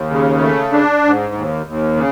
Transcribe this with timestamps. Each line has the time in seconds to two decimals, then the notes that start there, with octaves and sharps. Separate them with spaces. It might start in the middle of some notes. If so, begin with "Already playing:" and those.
Already playing: D#2
0.10 C#3
0.41 A3
0.72 D4
1.04 G#2
1.34 D#2
1.66 D#2
1.97 C#3